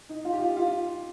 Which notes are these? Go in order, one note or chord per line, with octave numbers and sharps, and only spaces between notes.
D#4
F4
G4
F4
F4